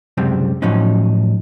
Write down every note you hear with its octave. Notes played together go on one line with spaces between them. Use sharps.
C#2 F#2 C3 G3 C4
A2 F3 F#3 C#4 D#4